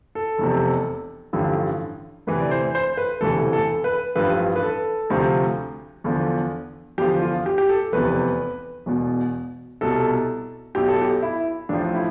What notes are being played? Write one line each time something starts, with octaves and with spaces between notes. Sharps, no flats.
A4
F1 E2 C3
A1 G2 D3 F3
D2 C3 E3 B4
D5
C5
C5
B4
E1 D2 C3 E3 A4
A4
B4
A1 G2 F3 B4
B4
A4
D2 C3 F3
E2 D3 F3
E2 D3 F3 G4
F4
G4
G4
A4
F1 E2 C3 B4
E1 E2 B2
C2 B2 A4
B1 B2 G4
A4
G4
E4
A1 A2 F3 D4
E4